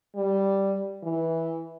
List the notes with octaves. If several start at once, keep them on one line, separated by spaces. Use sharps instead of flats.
G3
E3